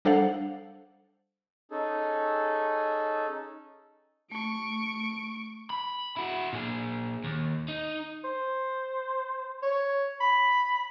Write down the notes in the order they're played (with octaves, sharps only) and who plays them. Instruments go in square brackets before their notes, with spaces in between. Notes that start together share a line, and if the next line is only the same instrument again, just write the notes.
[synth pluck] G3 D4 A4 C5 F5 F#5
[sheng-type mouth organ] C#4 D#4 G#4 A4
[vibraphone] A3 [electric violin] C#6 D7
[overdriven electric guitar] B5
E4 F#4
A#2 G#4
D#2
D#4
[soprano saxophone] C5
C#5
B5